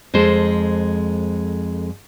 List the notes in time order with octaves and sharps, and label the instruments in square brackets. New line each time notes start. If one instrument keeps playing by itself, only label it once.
[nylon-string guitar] F2 G#3 A4 C5